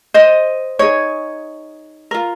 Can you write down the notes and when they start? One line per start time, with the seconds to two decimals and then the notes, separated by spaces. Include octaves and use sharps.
0.14 C5 D#5
0.79 D#4 G#4 C#5
2.11 F4 A#4